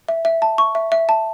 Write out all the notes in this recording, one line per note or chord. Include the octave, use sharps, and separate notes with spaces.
E5
E5
A5
C#6
E5
E5
A5